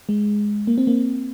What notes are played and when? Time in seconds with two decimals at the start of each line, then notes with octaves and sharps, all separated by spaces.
0.09 G#3
0.67 A#3
0.78 C4
0.87 A#3